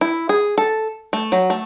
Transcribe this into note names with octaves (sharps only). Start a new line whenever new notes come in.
E4
G#4
A4
A3
F#3
A3